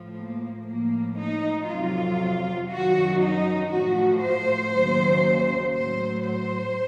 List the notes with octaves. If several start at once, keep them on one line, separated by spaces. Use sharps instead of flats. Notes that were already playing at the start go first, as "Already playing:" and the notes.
Already playing: A2 F3
A#3
A2 F3 A#3
D#4
F2 C3 F#3 F4
F#2 D#3 F#3 F#4
D#4
A2 F3 F#4
C5
D#2 C#3 F#3
A2 F#3 C5
C5